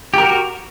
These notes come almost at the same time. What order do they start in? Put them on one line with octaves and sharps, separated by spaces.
G4 A#4 F#4